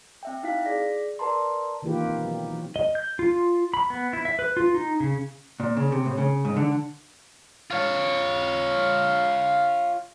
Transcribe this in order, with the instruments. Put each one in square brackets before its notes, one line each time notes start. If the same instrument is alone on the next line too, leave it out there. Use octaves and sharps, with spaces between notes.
[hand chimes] C4 E5 G5
D#4 E4 F#4 F5 B6
G#4 D5 A#6 B6
A#4 B4 D5 A5 A#5 C6
[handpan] D#3 E3 A#3 F4 G4 B4
B2 C4
F#3
E3
[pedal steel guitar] D#5
G6
F4
B5
B3
E4
E5
B4
F4
D#4
C#3
[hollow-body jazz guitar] A#2
C#3
C3
A2
C#3
G#2
D3
[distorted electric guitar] F4 C#5